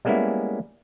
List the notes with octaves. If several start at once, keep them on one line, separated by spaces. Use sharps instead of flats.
G3 G#3 A#3 B3 C#4 E4